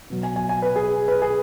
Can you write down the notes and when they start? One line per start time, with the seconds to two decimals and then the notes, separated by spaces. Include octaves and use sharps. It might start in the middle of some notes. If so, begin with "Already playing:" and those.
0.10 B2 F#3
0.23 G#5
0.36 G#5
0.49 G#5
0.62 B4
0.76 G#4
1.08 B4
1.22 G#4